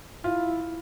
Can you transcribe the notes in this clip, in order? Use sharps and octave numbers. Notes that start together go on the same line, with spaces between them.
E4 F4